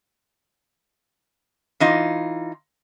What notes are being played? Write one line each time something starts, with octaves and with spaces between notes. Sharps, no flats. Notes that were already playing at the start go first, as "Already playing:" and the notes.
E3 D#4 F4